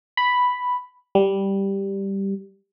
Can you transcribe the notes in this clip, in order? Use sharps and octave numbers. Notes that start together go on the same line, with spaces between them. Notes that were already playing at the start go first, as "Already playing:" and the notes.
B5
G3